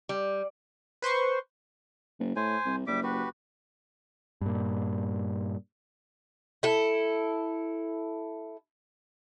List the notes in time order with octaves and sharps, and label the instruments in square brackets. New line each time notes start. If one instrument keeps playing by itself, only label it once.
[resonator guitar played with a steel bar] G3
[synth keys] B4 C5 C6 C#6
[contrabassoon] F#1
[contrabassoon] A2 [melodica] C5 G#5
[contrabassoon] C2
[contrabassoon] F#1 [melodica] G3 E5 D6
[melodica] F#4 G4 B4
[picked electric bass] G2 A#2
[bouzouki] E4 A4